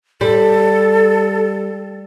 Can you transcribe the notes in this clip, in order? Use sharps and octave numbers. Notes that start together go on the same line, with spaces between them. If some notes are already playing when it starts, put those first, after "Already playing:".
G3 A4